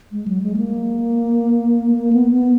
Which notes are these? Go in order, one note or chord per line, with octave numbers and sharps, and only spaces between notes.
G#3
F#3
G#3
A#3
A#3
B3
B3